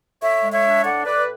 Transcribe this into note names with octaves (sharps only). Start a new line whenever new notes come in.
A2 C#5 E5
G#3
C#5 E5
D4
A2 D5 F#5
A2 B4 D5